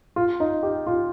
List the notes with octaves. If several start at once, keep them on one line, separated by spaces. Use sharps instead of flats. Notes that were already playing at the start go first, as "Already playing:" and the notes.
F4
D#4
G4
F4